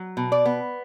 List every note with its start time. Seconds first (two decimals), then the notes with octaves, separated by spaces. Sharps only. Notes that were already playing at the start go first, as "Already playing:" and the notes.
Already playing: F#3
0.17 B2
0.32 D5
0.45 B3